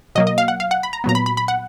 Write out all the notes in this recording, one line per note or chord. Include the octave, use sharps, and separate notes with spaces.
B2 F#3 A#3 D#5
D#5
F5
F#5
F5
F#5
B5
A#5
A#2 F#3 B3 A#5
B5
B5
B5
F#5